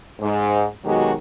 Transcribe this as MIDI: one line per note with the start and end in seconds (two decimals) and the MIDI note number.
0.20 0.65 44
0.84 1.13 47
0.84 1.13 51
0.84 1.13 54
0.84 1.13 56
0.84 1.13 66
0.84 1.13 67